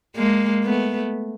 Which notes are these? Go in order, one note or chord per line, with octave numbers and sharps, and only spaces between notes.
G#3 A#3
A3 B3